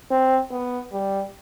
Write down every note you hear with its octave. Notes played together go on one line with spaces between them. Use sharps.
C4
B3
G3